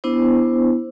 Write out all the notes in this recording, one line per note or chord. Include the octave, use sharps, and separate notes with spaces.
B3 D4 E4 C5